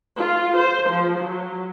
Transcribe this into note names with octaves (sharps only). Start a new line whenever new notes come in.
F4
C5
F3
F#3